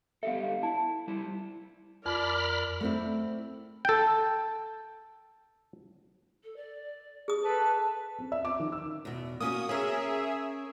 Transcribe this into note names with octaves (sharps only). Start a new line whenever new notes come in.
B3 G4 A4 E5 F5
E4 A5
G3 E4
F2 A#4 D5 B5 F6
A3 C4 E4
A4 G5
A4
D5
G#4 D#6
A4 B4 A5
C4
E5
D6
D#3
E6
E2 B2
A#3 C#4 F#4 D#6
C#4 G#4 A#4 E5